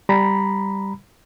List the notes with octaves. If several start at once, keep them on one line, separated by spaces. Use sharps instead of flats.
G3 A#5 B5